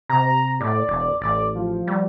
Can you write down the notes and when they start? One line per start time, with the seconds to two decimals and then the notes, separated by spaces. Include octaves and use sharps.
0.09 C3 A#5
0.61 A2 D5
0.88 E1
1.21 A1 D5
1.55 F3
1.87 G3